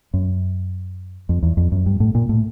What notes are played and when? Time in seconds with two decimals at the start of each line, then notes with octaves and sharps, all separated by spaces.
0.14 F#2
1.29 F2
1.43 E2
1.57 F2
1.72 F#2
1.86 G2
2.00 A2
2.15 A#2
2.29 A2